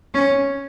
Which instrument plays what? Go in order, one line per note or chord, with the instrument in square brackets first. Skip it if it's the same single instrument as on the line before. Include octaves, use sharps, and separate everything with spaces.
[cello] C#4